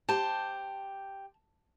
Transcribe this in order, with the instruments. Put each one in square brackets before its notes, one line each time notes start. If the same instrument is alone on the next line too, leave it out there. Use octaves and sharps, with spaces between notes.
[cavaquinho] G4 C5 [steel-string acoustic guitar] A5